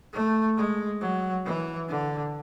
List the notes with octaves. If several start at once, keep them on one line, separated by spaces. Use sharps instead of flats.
A3
G#3
F#3
E3
D3